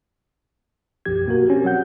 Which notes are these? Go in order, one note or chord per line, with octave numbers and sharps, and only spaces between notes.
B1 F#2 F3 G4 G#6
B2 A#3 F#4 A#4
C4 C#4 G4
F#3 C4 F#5 G6